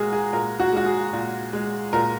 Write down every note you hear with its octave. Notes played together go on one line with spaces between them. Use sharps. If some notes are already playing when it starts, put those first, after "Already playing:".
Already playing: A#2 G#3 F#4 G#4 A#4
G#4
A#2 A#4
F#4
G#3 F#4
G#4
A#2
G#3
A#2 A#4